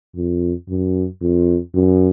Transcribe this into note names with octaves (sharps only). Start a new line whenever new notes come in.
F2
F#2
F2
F#2